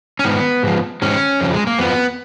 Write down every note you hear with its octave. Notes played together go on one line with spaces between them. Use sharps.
C#4
G#2 D#3 B3
G#2 F3
G#2 D#3 C#4
F2 C#3 F3
G#3
A#3
F2 F3 B3